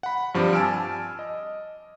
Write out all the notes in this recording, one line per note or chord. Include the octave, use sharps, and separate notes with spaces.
F#5 B5
G2 F3 G3 C4 D6
G#5 A5 E6 F6 D7
D#5